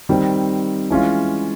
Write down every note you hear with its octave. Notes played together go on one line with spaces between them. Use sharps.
D#3 G3 C4
E3 G#3 C#4 F4